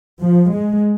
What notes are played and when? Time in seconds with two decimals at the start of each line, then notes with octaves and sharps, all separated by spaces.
0.21 F3
0.51 G#3